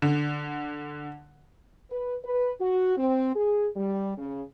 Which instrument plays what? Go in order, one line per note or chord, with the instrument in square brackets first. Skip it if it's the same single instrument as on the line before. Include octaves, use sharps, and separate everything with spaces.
[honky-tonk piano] D3
[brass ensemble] B4
B4
F#4
C4
G#4
G3
C#3